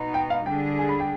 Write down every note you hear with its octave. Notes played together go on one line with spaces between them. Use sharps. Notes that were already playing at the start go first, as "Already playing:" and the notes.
Already playing: B2 B3 D#4
G5
F5
D3 G3 D4 G#4 G5
G#5
B5
G5